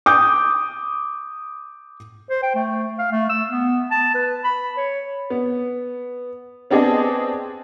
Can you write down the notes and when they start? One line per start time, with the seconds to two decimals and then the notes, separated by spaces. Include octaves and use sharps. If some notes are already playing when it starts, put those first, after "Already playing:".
0.06 D6 D#6 G6
2.30 C5
2.43 G5
2.55 A3
2.99 F5
3.12 A3
3.29 E6
3.51 B3
3.91 A5
4.15 B4
4.44 B5
4.77 C#5
5.30 B3
6.71 B3 C4 D4 G#4 D#5 A5